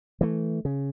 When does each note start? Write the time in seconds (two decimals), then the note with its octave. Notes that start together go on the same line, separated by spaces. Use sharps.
0.21 E3 A3
0.65 C#3